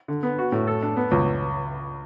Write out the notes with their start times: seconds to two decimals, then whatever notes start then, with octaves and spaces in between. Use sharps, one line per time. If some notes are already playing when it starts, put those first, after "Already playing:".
0.08 D3
0.23 B3
0.38 F#4
0.52 A2
0.67 A4
0.83 D4
0.97 B3
1.11 C#2